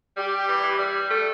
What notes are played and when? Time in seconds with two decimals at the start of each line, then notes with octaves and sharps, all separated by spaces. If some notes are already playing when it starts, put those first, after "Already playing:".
0.17 G3 G4
0.48 E3
0.63 E3
0.79 G3
1.10 A3